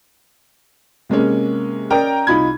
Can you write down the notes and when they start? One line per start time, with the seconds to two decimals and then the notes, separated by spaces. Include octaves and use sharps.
1.10 C3 G#3 A#3 C#4
1.90 C#4 A#4 D5 D#5 G5 A#5
2.27 C2 D#4 F4 B5 G#6